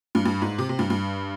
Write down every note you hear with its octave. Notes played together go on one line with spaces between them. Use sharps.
G2
G2
G#2
C3
C3
G2
G2